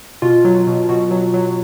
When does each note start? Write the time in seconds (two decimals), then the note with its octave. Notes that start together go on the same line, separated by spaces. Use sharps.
0.22 B2 F4
0.45 F#3
0.67 B2
0.89 B2 F#4
1.11 F#3
1.34 F#3